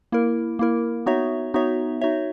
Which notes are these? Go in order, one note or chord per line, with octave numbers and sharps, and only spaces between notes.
A#3 E4 A#4
A#3 E4 A#4
B3 D#4 F#4 C#5 E5
B3 D#4 F#4 C#5 E5
D#4 F#4 C#5 E5